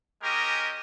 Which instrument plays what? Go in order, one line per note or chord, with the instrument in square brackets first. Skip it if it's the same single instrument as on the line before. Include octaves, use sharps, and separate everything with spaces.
[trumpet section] G#3 C#4 G4 A#4 D#5